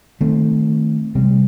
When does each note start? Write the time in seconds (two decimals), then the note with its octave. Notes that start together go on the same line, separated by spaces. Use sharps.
0.21 D#3 A3 C4
1.15 C3 G3 C4